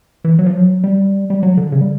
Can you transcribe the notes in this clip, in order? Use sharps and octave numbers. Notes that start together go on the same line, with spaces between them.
E3
F#3
F3
F#3
G3
G3
F#3
D3
C#3
G3